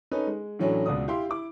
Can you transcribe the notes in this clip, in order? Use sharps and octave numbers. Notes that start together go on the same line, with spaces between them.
C#4 D#4 A4 B4
G#3
A2 E3 F#3 A3 C#4 D4
C#2 B2 D5 D#6
E4 G4 F5 C6
E4 D6